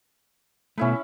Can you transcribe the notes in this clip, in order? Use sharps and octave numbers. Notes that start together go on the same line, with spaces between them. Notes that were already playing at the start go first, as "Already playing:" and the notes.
B2 A3 C#4 E4 B4